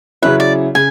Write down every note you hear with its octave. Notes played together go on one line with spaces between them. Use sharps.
C#3 F#3 C#4 E4 B4
D5
C#3 G#5